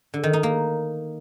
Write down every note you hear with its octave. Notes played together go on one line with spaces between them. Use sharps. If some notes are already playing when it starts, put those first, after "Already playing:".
D3
D#3
D#4
A#3